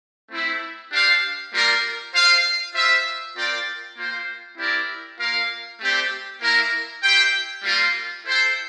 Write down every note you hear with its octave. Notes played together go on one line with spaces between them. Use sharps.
A3 C4 E4
D4 G4 C5 F5
G3 A#3 F4 A#4 D5
F4 C5 F5
F4 C5 E5
C4 F4 A#4 D5 G5
A#3 F4 C5 G5
C4 E4 G4 A#4 D5
A#3 F4 A#4 F5
A3 C4 G4 D5
A#3 E4 A#4
E4 G4 C5 G5
G3 A#3 F4
E4 A4 C5 G5